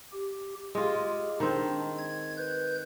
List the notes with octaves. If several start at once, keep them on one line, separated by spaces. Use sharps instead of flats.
G4
G#3 F4 G4
D#3 C4 D4
G#6
B4 G6